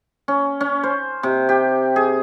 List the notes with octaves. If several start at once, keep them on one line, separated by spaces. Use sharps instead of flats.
C#4
C#4
C5
C3
G4
G#4